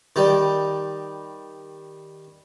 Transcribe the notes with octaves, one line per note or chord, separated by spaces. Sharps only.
D#3 G3